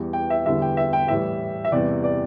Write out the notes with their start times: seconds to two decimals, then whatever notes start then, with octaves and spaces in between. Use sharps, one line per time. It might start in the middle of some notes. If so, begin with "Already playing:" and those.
Already playing: E2 E3 G3
0.13 G5
0.30 E5
0.45 E2 D3 G3 E5
0.62 G5
0.77 E5
0.93 G5
1.08 A2 E3 G3 E5
1.65 E5
1.72 E2 C3 E3 G3 D5
2.04 D5